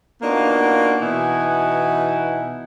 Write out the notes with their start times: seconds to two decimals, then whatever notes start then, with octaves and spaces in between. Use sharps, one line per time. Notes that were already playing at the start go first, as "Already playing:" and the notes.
0.22 A#3 B3 D4 D#4 F4 F#4
1.01 B2 E3 D#4 E4 F#5 G#5